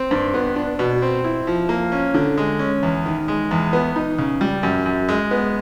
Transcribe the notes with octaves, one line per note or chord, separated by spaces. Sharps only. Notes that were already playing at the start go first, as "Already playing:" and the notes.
Already playing: C4
G2
B3
D4
B2
C4
E4
F3
A#3
C#4
D3
G#3
C#4
E2
D#3
G#3
E2
B3
D#4
C#3
G3
F#2
F#2
G#3
B3